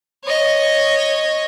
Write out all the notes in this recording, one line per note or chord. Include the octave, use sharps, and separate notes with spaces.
C#5 D#5